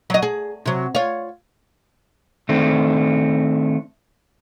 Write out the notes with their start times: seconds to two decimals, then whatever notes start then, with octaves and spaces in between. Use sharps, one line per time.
0.10 F#3 D#5
0.23 G#4
0.65 C3 F#3
0.95 F4 C#5
2.49 D#3 A3 C4 D4